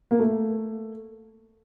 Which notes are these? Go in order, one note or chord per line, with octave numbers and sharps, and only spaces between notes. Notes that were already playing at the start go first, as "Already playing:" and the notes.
A#3
A3